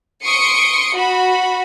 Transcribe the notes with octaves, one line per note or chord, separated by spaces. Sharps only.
C6 C#6 D#6 C#7 D7
F#4 B5